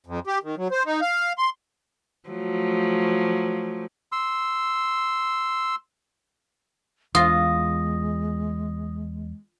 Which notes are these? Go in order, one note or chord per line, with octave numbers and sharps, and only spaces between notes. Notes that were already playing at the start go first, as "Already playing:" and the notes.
F2
G4
D#3
F#3
C5
D#4
F5
C6
F3 F#3 A3
C6 E6
E2 G#3 F4 D#6 A#6